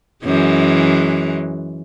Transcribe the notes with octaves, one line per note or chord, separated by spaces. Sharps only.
F#2 E3 G#3